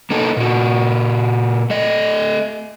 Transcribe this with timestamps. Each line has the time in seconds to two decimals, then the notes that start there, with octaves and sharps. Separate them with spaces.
0.11 A#3 B3 D#4 A4
0.37 A#2 F#4
1.70 A3 D#5